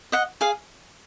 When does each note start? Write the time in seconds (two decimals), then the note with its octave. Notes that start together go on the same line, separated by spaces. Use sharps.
0.12 D#5 F#5
0.41 G#4 F5